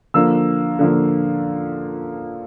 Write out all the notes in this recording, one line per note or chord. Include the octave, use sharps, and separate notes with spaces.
D3 F3 A#3 E6
D3 F3 A#3